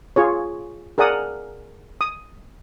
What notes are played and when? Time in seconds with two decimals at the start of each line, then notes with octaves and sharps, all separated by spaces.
0.16 F4 G#4 C#5
0.98 G#4 A#4 D5 F#5 D#6
2.01 D#6